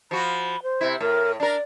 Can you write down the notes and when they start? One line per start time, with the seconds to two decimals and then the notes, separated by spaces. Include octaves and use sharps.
0.11 F3 F#4 B5
0.63 C5
0.81 C3 E4
1.00 A2 A#4
1.40 D4 A#4 D5